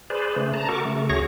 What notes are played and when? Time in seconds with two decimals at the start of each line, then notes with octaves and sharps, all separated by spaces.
0.10 G#4 B4 C5 D5
0.36 C#3 A3
0.54 A5 A#5
0.69 F#4 A4 A#4 C#6 D6
0.85 C#3 A3
1.09 D2 F#4 G#4 C#5 C#6 A#6